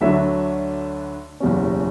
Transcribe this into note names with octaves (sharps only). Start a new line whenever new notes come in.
D2 D3 F#3 A3 D4 E5
F#1 E2 B2 G3 C#4